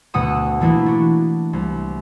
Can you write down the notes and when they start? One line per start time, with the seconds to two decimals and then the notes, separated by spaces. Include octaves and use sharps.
0.14 D2 B2 A3 F#5 D#6 E6
0.61 E3 A3 A#3 D4 E4
0.86 D4 F#4
1.53 C2